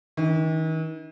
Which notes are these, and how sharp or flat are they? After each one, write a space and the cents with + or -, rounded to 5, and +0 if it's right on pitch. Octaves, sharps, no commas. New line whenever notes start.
D#3 +45 D4 +0